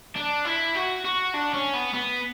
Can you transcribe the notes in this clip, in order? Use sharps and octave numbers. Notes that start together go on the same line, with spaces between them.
D4
E4
F#4
F#4
D4
C#4
B3
B3